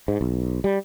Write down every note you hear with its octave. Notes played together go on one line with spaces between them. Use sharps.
G#2
B1
G3